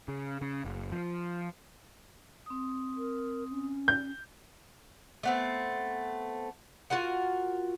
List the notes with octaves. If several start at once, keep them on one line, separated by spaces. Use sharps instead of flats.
C#3
C#3
F#1
F3
C4 D#6
A#4
C#4
G6
A3 B3 C4
F4 F#4 A#4 F#5